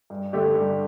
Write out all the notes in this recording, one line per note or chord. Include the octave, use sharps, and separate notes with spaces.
G2
D3 A3 D4 G4
G2